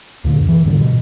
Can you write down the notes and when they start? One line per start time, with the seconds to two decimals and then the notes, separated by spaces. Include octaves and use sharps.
0.24 D2 A#2 D3
0.36 F#2
0.49 E3
0.65 E1 G#2 D3 G3
0.81 B2